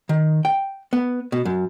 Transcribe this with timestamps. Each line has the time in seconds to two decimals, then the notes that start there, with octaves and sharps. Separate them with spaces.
0.09 D#3
0.45 G5
0.93 B3
1.32 B2
1.45 F#2